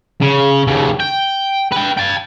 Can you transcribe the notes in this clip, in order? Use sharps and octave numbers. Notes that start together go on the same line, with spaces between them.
C#3
D#2 C#3
G5
B4 G5
G5 A5